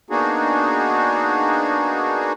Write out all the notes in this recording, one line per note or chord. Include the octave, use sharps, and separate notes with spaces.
A#3 B3 D4 D#4 F#4 G#4